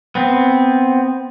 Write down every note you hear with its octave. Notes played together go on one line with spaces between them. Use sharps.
B3 C4